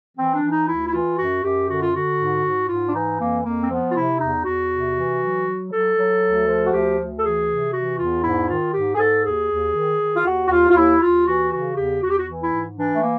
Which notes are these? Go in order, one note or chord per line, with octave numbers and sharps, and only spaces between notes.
E3 C4
D4
E3
D#4
D2 E4
E4
E3 F4
F#2 F#4
F#2 G4
D3 F#4
F4
D3 F#4
G#2
G#2
G#2 F4
D4
E3 D#4
F2 A#3
F2 A#3
C4
F3 B3
F4
C3 E4
E2 D#4
E2 F#4
C3
E3
F#3
F#3
F#3 A4
F#3
D2
F3
F#4
D2 G4
D2
A4
E3 G#4
C3
E3 F#4
E2 F4
G#2 E4
D#3 F4
G#2 G4
G#4
G#2 A4
D#2 G#4
D#2
D#3
D#3
F4
D#2 F#4
F#4
D#2 F4
F4
D#2 E4
D#2 F4
E3 F#4
C#3 F#4
E2 G4
E2 F#4
G4
F#4
E3
E4
G#2
E3 D4
A3
A#3